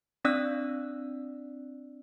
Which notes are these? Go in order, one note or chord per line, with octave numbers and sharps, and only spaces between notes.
C4 D4 D5 E6 F#6